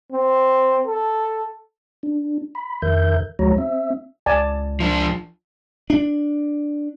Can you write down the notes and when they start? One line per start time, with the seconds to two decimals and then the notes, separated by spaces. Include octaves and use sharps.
0.12 C4
0.87 A4
2.03 D4
2.55 B5
2.82 F2 D#3 A#4 E5 G6
3.39 D2 F3 G#3 F#4 C#5 A#5
3.58 C4 E5
4.26 C#2 D5 G#5 A5
4.80 F3 D4
5.90 D4